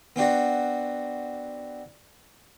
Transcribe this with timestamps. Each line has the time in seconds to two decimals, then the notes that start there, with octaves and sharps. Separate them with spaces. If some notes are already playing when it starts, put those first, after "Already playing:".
0.16 B3 C4 D4 F#4